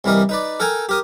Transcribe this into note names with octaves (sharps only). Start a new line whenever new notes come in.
C2 E3 G3 A#4 D#5
D#4 B4 D5
A4 A#4 G5 G#5 A#5
G4 A#4 D#6